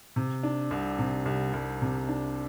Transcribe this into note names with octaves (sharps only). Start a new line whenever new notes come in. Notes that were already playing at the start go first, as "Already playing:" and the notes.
C3
D4
C2
C3
C2
C2
C3
D4